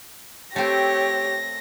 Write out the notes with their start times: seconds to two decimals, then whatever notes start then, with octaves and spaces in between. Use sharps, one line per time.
0.56 A3 C4 G4 C#5 A#6